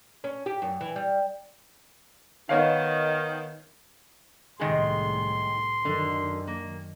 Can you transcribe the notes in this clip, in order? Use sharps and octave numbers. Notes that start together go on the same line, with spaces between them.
C#4
G4
F#2
E3
G3
D#3 B3 C#5 F5
C2 A2 D#3 G#3 G#4 C6
F#2 D3 D#3
A#3